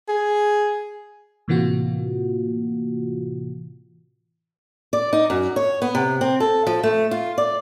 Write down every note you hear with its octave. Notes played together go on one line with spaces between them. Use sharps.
G#4
A2 C3 E3 A#3 F4 F#4
D5
D#4
F#2
C#5
B3
C3
C4
A4
F3
A3
F4
D5